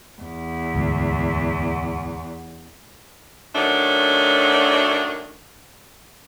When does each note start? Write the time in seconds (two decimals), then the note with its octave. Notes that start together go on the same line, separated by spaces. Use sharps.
0.22 E2
0.75 D2 G#2
3.55 F#2 D#3 F#3 A3 D4